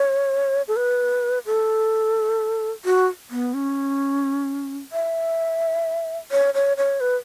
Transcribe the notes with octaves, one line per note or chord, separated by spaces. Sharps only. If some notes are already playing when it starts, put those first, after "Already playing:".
Already playing: C#5
A4
B4
A4
F#4
B3
C#4
E5
C#5
C#5
C#5
B4